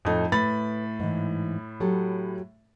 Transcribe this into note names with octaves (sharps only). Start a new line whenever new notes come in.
F2 A2 D#4 A4
A2 B4 B5 A6
G#2 E3
F#3 G4 A4